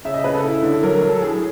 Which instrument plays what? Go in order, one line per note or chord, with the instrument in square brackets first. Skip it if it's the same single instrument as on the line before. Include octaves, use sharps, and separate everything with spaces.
[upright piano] C#3 E5
D#5
C#3 B4
A4
E4
D3
F#3 A#4
A#4
F#3
A4
A2 G#4